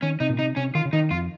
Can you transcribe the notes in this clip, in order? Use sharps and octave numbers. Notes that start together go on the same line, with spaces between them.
D#3 C#4
C3 D#4
A#2
C3 D#4
C3 C#4
D#3 F4
C#3
D#3 D#4
F2 F4